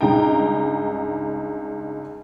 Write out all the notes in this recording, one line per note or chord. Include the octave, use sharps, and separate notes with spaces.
C#2 G2 D#4 G5 A#5